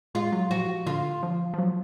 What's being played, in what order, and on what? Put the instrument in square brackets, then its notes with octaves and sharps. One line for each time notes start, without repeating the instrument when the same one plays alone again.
[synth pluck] G#3 [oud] F4
[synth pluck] F#3
[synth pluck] F3 [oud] F#4
[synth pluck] D3 [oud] F4
[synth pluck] F3
F3
F#3